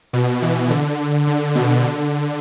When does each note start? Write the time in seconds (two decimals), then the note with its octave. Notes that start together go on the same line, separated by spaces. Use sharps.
0.13 B2
0.42 B2 E3
0.70 D3
1.27 D3
1.55 B2
1.84 D3